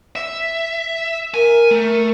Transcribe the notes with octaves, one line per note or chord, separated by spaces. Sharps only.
E5
A#4 G#5
A3